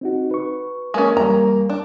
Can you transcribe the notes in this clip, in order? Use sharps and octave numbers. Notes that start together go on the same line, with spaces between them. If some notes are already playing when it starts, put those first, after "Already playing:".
C4 D#4 F#4
B4 C#6
G#3 A#3 C#4
E2 G3 A#5
D4